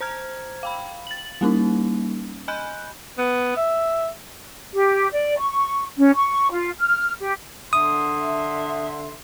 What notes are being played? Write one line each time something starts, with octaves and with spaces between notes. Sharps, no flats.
C5 A#5 F6 G#6
F5 G5 B5
A6 F#7
G3 A#3 C#4 D#4
D#5 G#5 B5 F#6 G6
B3
E5
G4
D5
C#6
C#4
C#6
F4
F6
G4
D3 E5 C6 D#6